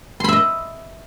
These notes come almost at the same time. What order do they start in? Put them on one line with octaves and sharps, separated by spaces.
C6 B5 E5 D#5